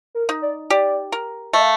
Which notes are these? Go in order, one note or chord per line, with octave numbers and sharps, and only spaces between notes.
A#4
D#4
D5
G4 D5
A#4
A3 D#5
F5